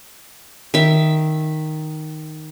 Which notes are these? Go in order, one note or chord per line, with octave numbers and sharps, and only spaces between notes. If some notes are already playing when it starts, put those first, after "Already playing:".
D#3 E5